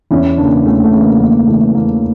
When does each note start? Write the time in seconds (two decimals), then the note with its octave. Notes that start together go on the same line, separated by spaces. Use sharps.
0.11 E2 C#4 E4
0.38 C#3 E3 A#3 D4
0.65 E2 A3 C#4
0.84 A3
0.93 C#3 E3
1.01 A#3
1.20 E2 A#3
1.39 A#3
1.47 C#3 E3 A3
1.74 E2 A#3